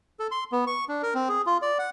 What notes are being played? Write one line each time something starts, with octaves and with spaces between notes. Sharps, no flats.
A4
C6
B3
C#6
D4
A#4
C4
G#4
F4
D5
F#5